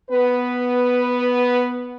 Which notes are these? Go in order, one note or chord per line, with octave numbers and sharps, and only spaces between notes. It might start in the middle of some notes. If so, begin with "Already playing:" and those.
B3 B4